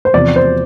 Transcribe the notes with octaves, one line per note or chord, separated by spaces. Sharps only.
C5
E2 C3 F3 D5
C5